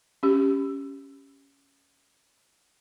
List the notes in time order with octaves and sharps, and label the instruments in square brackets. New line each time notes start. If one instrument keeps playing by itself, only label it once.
[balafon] C#4 G4